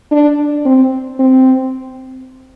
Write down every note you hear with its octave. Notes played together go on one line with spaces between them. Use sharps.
D4
C4
C4